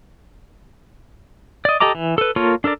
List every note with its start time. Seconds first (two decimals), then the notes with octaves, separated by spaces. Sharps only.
1.65 D5 D#5
1.80 G4 A4 D#5 A#5 D6
1.95 E3
2.18 A4 B4
2.36 A#3 F4 A4 A#4 C#5
2.64 D4 A4 A#4 D5